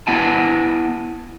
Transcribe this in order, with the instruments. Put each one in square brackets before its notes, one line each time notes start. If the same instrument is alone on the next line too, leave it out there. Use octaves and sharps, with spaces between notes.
[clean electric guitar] B3 E4 F#5 G#5 A5